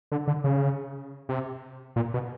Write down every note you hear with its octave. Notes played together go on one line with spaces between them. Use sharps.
D3
D3
C#3
C3
A#2
B2